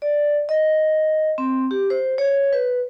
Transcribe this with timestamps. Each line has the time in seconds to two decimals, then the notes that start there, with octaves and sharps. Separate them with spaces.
0.02 D5
0.49 D#5
1.38 C4
1.71 G4
1.90 C5
2.18 C#5
2.53 B4